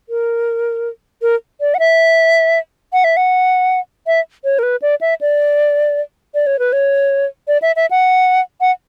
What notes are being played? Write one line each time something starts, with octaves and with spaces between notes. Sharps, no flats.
A#4
A#4
D5
F#5
E5
F#5
E5
F#5
E5
C#5
A#4
B4
D5
E5
D5
D5
C#5
B4
C#5
D5
E5
E5
F#5
F#5